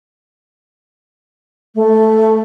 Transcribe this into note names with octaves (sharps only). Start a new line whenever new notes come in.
A3